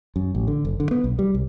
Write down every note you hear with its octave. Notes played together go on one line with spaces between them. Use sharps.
F#2
A1
D3
F#1
D3
B3
B1
G3
C2